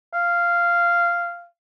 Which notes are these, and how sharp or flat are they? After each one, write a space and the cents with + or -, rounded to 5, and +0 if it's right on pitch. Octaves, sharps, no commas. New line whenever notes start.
F5 -10